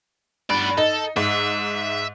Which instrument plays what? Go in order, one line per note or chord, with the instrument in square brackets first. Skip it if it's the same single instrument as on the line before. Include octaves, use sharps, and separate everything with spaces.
[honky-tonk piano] G2 [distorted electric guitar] B3 D5
[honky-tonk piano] D#4 [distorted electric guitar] A4
[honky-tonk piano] G#2 [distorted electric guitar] E5